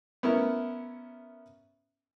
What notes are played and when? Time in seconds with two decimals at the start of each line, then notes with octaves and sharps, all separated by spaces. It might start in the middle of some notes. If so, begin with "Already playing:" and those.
0.23 B3 C#4 E4 A#4